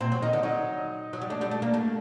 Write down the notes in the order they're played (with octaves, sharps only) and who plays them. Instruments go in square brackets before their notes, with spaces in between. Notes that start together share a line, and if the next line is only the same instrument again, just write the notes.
[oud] A#2 [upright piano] C4 C5
[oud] F#3
[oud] D#3 [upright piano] D#4 D#5
[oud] D3
[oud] F#3 [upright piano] D#4 D#5
[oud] F#3
G3
[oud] A3 [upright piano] D4 D5
[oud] G3
A3
A#3
A3